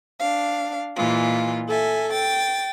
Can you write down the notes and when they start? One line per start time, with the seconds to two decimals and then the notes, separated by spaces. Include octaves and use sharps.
0.18 D4 F5
0.95 A#2 E3 G#3 F4
1.67 A4 E5 G#5
2.11 G5 A6